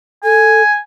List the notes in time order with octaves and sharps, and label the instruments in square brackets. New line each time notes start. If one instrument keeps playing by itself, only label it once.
[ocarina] A4 [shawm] G#5